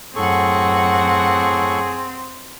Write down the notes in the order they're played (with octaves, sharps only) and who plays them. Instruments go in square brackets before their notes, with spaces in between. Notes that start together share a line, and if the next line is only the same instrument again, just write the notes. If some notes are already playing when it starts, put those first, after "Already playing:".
[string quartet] F#2 F#5 [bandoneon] A2 A4 C#6 [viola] C4 [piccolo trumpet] G#4